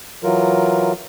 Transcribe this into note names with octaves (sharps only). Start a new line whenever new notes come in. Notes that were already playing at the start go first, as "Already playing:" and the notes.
E3 F#3 F4 A#4